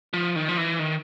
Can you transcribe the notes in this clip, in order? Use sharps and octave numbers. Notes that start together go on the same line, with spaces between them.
F3
D#3
F3
E3
D#3